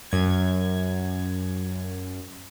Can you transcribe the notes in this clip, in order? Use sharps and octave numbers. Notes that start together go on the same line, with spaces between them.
F#2 G#6